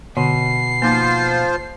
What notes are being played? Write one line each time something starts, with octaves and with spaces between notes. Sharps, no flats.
B2 D3 C7
F3 A#3 D#4 F4 C5